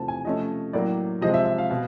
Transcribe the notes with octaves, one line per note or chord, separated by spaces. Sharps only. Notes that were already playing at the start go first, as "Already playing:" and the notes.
Already playing: E2 C3 F3 A3 C4 A5
G#5
C3 F3 A3 C#4 D#5
A2 F#3 A#3 D5
C3 F3 G#3 C4 D#5
E5
E5
F5
B2 F5